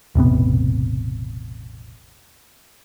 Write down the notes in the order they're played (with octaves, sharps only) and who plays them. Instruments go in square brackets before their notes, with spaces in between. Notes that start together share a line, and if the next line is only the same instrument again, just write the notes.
[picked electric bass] E1 A1 C3 B3